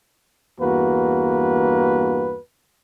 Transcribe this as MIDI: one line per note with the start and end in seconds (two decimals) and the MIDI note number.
0.60 2.37 40
0.60 2.37 43
0.60 2.37 58
0.60 2.37 66
0.60 2.37 71